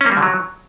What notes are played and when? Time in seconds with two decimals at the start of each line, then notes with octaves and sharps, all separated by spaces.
0.01 C#4
0.06 A#3
0.12 G3
0.17 D3
0.22 F#3